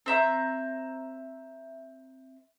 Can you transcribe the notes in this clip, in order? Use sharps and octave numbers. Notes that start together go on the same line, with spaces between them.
C4 E5 A#5